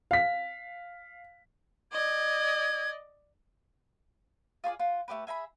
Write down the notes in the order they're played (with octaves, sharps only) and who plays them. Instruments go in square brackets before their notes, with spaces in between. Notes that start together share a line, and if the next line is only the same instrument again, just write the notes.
[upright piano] F5 B6
[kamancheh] D5 D#5 [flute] G#6
[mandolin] F4 G#4 C#5 D5
F4 F#5
A3 B3 G4 B4
G#4 E5 A#5 B5